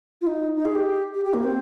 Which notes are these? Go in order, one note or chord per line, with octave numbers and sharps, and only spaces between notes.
F4
D#4
D#4
G#4
G4
G4
G4
A#3
C4